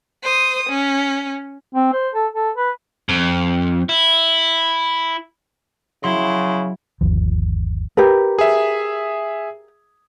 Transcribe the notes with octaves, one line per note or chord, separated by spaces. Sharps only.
C5 D#6
C#4
C4
C5
A4
A4
B4
F2
E4
C#3 F#3 E4 C6
G1 D#2 F3
G4 A#4 B4
G#4 E5